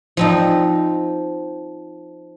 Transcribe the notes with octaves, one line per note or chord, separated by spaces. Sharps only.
F3 C4 D#4